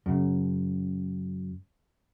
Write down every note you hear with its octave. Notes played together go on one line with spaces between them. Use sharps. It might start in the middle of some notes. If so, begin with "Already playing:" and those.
F#2 C#3